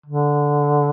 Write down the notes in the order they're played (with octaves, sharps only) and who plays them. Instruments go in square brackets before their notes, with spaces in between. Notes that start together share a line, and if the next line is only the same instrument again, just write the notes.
[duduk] D3